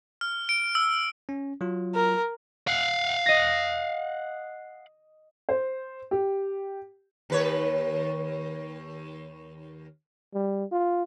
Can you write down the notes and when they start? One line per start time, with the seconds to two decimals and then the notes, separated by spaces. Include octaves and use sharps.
0.21 F6
0.49 D7
0.75 E6
1.29 C#4
1.61 F#3 F4
1.95 A#4
2.67 F5 F#5
3.26 D#5 A#6
5.49 C5
6.11 G4
7.30 D#2 B4 C#5
10.34 G3
10.72 F4